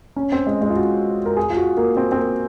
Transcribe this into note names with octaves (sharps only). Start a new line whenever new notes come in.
C#4
C4
G#3
G#3
F4
F#4
A#4
G#4
F4
F#4
A#3
C4
C4
A#3